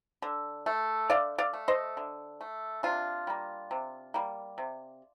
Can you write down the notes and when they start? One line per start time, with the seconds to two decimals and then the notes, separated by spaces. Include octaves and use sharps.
0.22 D3
0.66 A3
1.10 D3 D5 F5
1.38 D5 F5
1.53 A3
1.68 C5 D#5
1.97 D3
2.41 A3
2.83 C3 D4 F4
3.27 G3 A#3
3.71 C3
4.14 G3 A#3
4.58 C3